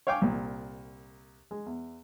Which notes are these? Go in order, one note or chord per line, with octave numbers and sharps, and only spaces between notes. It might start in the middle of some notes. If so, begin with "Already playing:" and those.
C#5 F5 G5 G#5 D6
C2 A#2
G#3
E2